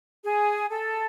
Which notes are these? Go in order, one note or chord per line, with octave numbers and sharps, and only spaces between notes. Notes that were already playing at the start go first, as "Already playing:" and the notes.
G#4
A4